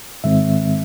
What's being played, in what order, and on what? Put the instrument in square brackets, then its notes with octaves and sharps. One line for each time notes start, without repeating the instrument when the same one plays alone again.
[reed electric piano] G#2 D#3 G#3 C4 E5